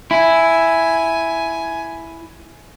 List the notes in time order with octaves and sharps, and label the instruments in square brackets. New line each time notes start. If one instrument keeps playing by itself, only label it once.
[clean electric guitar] E4 [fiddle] G#5